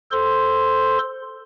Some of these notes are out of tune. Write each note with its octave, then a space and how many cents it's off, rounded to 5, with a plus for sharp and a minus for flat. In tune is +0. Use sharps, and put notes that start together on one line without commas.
A4 +0 C5 +0 C6 +0